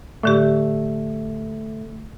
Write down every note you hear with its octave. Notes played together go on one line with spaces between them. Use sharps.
A2 D3 A3 G4